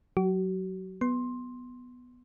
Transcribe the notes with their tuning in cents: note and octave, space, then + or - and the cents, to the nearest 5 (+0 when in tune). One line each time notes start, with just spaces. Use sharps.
F#3 +0 F#4 +40
B3 +0 C6 +15